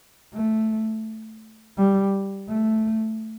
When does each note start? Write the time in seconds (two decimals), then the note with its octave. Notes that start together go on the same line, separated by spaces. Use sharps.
0.34 A3
1.77 G3
2.48 A3